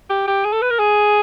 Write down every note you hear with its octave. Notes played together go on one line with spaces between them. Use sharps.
G4
G4
G#4
A4
B4
A#4
G#4